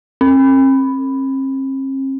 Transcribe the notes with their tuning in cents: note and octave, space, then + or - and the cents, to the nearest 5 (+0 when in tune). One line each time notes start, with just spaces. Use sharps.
C4 +45